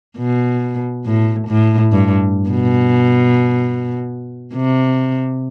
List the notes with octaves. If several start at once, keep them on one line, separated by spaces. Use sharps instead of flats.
B2
A2
A2
G2
B2
C3